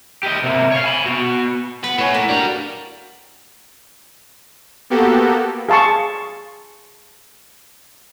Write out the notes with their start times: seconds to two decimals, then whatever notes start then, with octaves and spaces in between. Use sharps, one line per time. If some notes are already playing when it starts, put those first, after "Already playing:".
0.23 G4 D#5
0.44 C3 A#3
0.72 C#5 F5
0.84 G#5 B5
1.06 B3 F#4
1.84 B3 B4
1.99 A2 B4 C#5 G#5
2.14 A3 A#3
2.29 G3 D4 F#4 A#4
4.90 A#3 B3 F#4 G4 A4
5.69 G#4 F5 A5 C6 C#6